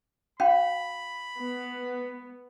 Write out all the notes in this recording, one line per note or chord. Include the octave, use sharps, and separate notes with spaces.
C#4 F#4 F5 G5 B5
B3